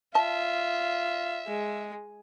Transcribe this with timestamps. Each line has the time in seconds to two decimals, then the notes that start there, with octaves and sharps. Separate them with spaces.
0.15 F4 E5 A5
1.47 G#3